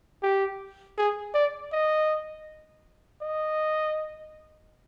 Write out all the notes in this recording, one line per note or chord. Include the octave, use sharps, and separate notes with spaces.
G4
G#4
D5
D#5
D#5